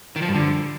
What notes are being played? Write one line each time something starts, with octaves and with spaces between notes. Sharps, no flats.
D#3
F3
G2
D3